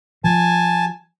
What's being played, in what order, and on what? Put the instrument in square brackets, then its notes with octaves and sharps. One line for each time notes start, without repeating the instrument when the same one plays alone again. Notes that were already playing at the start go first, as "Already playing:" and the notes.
[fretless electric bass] F3 [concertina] G#5 A5